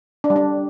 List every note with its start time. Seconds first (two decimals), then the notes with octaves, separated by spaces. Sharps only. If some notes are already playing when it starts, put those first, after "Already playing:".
0.24 D4
0.30 G3
0.36 D4